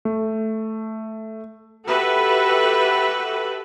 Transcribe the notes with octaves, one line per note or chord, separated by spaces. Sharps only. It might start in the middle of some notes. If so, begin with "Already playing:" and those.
A3
F#4 G4 A4 B4 E5